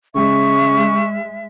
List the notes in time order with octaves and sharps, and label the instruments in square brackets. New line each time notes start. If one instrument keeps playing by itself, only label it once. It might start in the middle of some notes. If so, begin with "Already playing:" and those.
[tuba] C#3 [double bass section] G#3 [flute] E5 [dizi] C#6